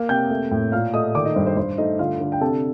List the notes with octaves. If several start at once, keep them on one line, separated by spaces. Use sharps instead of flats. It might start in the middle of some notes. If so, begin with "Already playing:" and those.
Already playing: A#3 F5
C3 G5 G6
A3
A2
A#2 F5 F6
A3 D#5 D#6
D#3 D5 D6
D#4 D#5
G2 C5
C5
G2 C5
A3 D#4 D#5
D3 F4 F5
D3
G5
C3 A4 A5